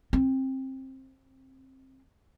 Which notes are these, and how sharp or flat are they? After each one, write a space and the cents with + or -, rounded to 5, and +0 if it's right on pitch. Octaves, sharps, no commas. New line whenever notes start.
C4 +20